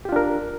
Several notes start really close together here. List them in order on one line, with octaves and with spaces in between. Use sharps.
G4 F4 D4 A#4